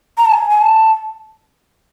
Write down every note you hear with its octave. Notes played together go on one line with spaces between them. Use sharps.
A#5
A5
G#5
G#5
A5